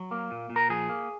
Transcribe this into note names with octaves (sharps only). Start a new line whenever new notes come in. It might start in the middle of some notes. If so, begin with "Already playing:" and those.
Already playing: F#3
A#3
A#2
A#2
A#4
F3 G#4
A#3